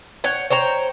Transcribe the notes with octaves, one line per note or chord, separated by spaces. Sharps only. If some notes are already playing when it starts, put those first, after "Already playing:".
C#5 F#5 G5
C5 C#5 G5 A#5